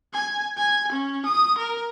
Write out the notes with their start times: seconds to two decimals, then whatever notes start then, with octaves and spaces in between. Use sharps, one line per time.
0.13 G#5
0.57 G#5
0.92 C#4
1.26 D#6
1.58 A#4